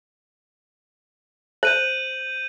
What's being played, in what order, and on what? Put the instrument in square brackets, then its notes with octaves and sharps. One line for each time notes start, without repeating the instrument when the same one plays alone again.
[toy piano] C5 [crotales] G6 D#7 F#7